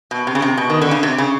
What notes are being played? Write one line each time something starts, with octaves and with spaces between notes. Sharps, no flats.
B2
C3
C#3
C3
B2
D#3
D3
C#3
C3
C#3